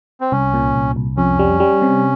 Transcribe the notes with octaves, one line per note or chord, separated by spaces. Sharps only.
C4
C2 C#4
A#2
C2
C2
F2 C#4
G3
G3
C3